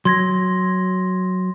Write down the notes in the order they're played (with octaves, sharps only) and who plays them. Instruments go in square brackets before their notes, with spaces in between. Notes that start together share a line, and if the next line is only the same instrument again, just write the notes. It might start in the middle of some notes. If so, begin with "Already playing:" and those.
[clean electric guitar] F#3 [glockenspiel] C6 G#6 A#6